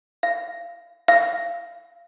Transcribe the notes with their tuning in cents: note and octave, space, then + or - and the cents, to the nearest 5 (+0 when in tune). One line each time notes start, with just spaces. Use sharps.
F5 -20
F5 -20